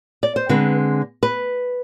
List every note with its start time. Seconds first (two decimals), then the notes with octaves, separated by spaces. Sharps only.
0.23 D5
0.36 C5
0.49 D3 G#3 C4 B4
1.23 B4